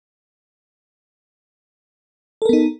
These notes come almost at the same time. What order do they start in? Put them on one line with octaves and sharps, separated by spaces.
A4 A#4 B3 D#4